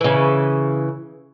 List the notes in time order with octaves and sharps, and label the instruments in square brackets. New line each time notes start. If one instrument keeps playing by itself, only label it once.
[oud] C#3 E3